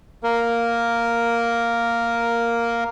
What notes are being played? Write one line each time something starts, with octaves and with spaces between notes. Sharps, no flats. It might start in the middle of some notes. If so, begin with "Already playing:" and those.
A#3 A#4